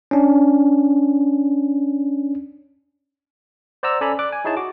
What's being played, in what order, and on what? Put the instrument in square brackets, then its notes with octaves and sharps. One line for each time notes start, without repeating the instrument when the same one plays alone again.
[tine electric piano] C#4 D4
C5 D5 F#5 A#5 E6
C#4 A4 D5 G#5 A#5 B5
D5 D6 F#6
G#5
D#4 E4 G#4 C#5 A5
F#4 D6